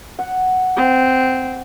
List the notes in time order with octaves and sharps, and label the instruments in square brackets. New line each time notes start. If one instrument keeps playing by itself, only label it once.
[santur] F#5
[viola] C4